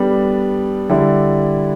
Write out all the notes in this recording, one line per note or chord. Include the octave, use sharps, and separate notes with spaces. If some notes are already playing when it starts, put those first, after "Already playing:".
Already playing: G3 B3 D4 A4
D3 G3 E4